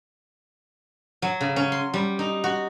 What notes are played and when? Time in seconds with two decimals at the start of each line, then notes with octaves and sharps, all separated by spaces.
1.22 F#3
1.40 C#3
1.56 C#4
1.72 C6
1.94 G3
2.19 D#4
2.44 F#4